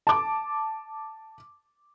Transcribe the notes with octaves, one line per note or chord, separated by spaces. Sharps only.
A5 D6